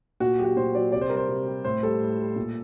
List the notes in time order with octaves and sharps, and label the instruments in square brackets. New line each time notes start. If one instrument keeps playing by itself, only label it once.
[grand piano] A#2 F#4
F#3 G4
F#4
A#2 C5
F#3 D5
C3 D5
C5
G3 A#4
C5
C3
G3
A2 C5
G3 A4
A2
G3
A#2